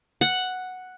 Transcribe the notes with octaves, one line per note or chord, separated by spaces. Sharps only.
F#5